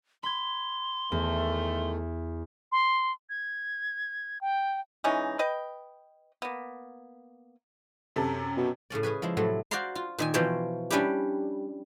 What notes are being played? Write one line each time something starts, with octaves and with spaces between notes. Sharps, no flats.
B5 C6 G#6
E2 D#3 A3
C6
G#6
G5
E3 G#3 C#4 D#4
B4 D#5 G5
A#3 B3
F#2 C3 A4
B2
A2 C#3 C#4 D5
C#4 G#4 B4 G#5
F3 G#3 E4
A2 C3 F#3 A3
F#4 C5 D5 F5 A#5 C6
F4
A#2 D#3 G#5
B2 E3 F3 C5 C#5 G5
G3 C#4 D4 E4 G4